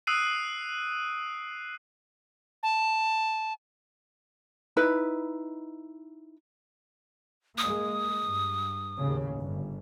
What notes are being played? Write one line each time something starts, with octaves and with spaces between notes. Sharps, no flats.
D#6 E6 F#6 C7 D7 D#7
A5
D#4 E4 B4
G#3 A#3 D#6
G2
D#2 A2 C#3
G1